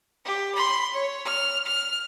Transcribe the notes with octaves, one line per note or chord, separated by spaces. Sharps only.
G4
B5 C6
C#5
F6
F6